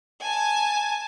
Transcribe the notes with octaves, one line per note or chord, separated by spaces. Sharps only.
G#5 A5